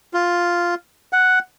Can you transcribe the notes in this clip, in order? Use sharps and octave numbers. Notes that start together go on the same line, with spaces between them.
F4
F#5